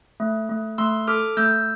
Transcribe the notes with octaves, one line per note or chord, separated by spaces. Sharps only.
A3
A3
A3 C6 E6
A4 D6 F6
A3 E6 G6